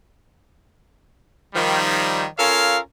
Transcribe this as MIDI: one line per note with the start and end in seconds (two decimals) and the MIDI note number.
1.55 2.25 51
1.55 2.25 53
1.55 2.25 55
2.39 2.78 61
2.39 2.78 65
2.39 2.78 69
2.39 2.78 70
2.39 2.78 73
2.39 2.78 77